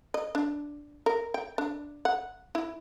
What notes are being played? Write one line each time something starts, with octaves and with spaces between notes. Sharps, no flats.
D#5
D4
A#4
G5
D4
F#5
E4